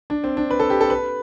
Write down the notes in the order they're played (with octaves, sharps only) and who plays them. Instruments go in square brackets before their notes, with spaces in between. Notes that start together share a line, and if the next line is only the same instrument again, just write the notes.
[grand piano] D4
C4
D4
B4
A4
G4
A4
B4